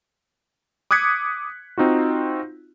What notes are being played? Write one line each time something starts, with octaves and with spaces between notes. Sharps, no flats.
D6 D#6 F#6 G#6 B6 C#7
C4 D#4 F4 F#4